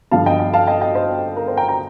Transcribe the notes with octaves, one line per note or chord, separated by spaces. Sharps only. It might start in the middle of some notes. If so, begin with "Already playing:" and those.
G2 D3 F3 F5 A5
D#5 G5
D#5 G5
F5 A5
D#5 G5
D#5 G5
C5 D#5
A#4
C5
G5 A#5
G5 A#5